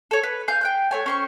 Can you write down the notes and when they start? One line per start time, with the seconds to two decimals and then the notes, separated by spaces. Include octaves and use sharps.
0.11 A4 C#5
0.23 B4
0.48 F5 G#5 G6
0.61 G5 F#6 G6
0.91 A3 C#5 G#5
1.06 C#4 C5 C#6